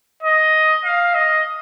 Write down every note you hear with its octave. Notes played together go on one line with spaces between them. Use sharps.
D#5
F5
D#5